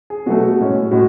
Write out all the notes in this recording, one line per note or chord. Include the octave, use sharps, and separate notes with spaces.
G#4
B2 F#3 A3 F#4
A2 G#3 C#4
G#4
A2 G#3 F#4